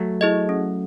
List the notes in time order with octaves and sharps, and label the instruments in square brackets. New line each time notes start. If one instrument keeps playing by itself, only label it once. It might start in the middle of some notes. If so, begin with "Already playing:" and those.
Already playing: [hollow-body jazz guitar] F#3 A3
[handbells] E4 G#4 D#5
C#4